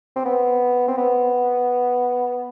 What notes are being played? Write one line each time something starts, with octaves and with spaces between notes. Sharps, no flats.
C4
B3
C4
B3